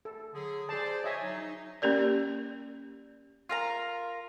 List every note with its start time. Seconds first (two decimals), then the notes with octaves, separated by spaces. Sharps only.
0.05 A4
0.34 D3 F#3 G#4
0.69 G#4 C5 D5 A5
1.04 F#4 C#5 D#5 E5 G#5
1.22 F#3 D#4
1.41 D#4
1.82 A#3 C#4 G4 A#4 D5
3.49 F4 A#4 A#5